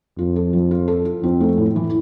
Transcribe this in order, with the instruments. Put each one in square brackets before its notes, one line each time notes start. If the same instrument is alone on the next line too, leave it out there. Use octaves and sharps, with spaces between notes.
[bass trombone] F2 [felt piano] F4
[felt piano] A4
F3
F4
A4
F4
[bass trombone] F2 [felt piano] C4
[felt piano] A3
A2
E3